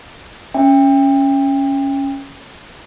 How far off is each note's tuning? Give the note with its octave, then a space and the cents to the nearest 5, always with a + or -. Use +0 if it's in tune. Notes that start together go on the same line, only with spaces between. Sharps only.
C#4 +0 E5 +0 G5 +30